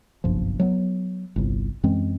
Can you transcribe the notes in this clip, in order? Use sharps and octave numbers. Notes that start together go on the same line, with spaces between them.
F#1 B1 G2 F3
F#3 G#3 B3
G1 C2
F#2 E3 G#3 C4